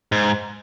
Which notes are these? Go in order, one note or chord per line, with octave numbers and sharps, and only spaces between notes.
G#2